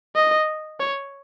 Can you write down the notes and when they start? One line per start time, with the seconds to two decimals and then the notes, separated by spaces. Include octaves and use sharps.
0.15 D#5
0.80 C#5